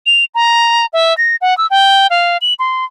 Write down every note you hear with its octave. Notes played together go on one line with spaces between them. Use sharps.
F7
A#5
E5
A#6
F#5
E6
G5
F5
F#7
C6